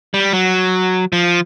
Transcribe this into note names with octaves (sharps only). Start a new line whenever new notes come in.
G3
F#3
F3